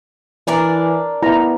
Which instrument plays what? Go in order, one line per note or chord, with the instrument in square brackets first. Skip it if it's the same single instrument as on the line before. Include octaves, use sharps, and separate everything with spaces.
[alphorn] E3 [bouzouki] D4 A#4 D5
[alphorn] B3 [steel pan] E4 A#5